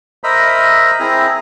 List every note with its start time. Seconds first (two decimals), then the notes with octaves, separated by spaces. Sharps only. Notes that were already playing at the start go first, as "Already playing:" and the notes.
0.24 A#4 C5 D#5 E5 A#5 B5
1.00 C4 E4 G#4 A#5